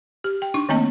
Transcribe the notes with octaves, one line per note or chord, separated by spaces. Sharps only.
G4
G5
D4 D#4 C#6
D#3 A3 A#3 C4 D#5 A5